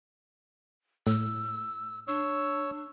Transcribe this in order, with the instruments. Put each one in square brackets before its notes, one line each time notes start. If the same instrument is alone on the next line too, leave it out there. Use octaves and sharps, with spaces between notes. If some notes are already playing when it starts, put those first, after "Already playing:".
[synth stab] A2 [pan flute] E6
[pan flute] D4 [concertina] C#5 E6